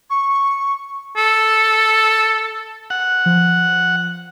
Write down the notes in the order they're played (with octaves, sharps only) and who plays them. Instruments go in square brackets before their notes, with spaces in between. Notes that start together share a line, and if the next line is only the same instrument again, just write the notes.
[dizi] C#6
[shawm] A4
[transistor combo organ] F#5
[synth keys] F3